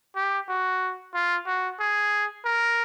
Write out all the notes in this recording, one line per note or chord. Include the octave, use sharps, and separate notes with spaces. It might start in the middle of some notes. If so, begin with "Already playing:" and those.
G4
F#4
F4
F#4
G#4
A#4